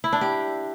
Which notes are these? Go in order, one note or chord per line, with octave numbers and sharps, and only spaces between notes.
E4
D4
G4